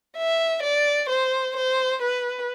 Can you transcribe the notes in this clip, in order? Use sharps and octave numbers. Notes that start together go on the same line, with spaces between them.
E5
D5
C5
C5
B4